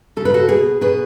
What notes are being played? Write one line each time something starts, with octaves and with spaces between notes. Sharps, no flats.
C#3 A4
B4
F#4 A4
B2 G#4 B4
B2 G#4 B4